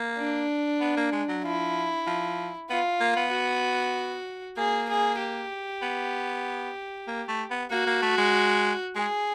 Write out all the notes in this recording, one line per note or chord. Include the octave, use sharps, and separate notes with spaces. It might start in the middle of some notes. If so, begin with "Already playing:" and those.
Already playing: A#3
D4
B3
A#3
G#3
F#3
F3 E4
F3
B3 F4
A#3
B3
F#4
A#3 G#4
G#4
G4
B3
A#3
A3
B3
A#3 F#4
A#3
A3
G#3
G#3 G#4